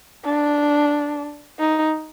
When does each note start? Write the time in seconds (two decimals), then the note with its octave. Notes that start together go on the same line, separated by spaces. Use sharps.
0.25 D4
1.59 D#4